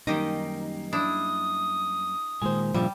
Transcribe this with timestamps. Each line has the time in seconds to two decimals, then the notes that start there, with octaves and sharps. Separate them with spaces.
0.07 F#2 D#3 G3 A#3 D#4 G4 D#5
0.93 D4 E4 D#6
2.42 A#2 D#3 G#3 C5 G#5
2.74 G2 A#2 C#3 F3 G3 E5